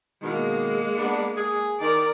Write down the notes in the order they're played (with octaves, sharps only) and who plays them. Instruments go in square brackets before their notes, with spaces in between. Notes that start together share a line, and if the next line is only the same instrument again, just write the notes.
[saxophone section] B2 D#3 [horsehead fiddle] G#3 A#3
[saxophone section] B3 D4
G#4
[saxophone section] D#3 [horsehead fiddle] A#4 D5